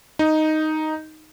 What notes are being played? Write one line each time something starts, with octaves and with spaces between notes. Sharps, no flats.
D#4